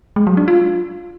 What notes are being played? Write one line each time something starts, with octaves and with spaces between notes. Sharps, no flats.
G#3
F#3
D4
F4